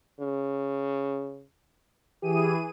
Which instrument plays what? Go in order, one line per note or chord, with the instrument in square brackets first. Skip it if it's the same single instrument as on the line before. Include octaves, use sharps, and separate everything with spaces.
[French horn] C#3
[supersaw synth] E3 G#4 D#7 [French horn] G4